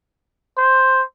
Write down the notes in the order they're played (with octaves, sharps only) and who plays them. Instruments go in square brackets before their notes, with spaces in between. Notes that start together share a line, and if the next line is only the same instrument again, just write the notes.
[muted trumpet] C5